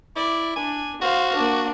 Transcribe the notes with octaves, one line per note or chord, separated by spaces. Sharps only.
E4 D5
D4 G#5
F#4 C5 F5
A#3 D4